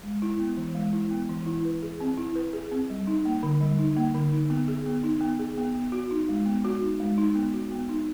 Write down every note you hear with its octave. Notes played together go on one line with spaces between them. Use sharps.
G#3
E4
B3
E3
G#3
E4
B3
E3
E4
B4
G#4
C4
E4
B4
G#4
C4
G3
D#4
A#3
D3
G3
D#4
A#3
D3
D#4
B3
G#4
B3
D#4
B3
G#4
B3
B3
F#4
D#4
G#3
B3
F#4
D#4
G#3
D#4
B3
F#4
B3
D#4